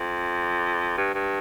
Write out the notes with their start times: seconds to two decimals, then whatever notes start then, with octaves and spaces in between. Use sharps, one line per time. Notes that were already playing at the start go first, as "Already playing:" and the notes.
Already playing: F2
0.97 G2
1.14 G2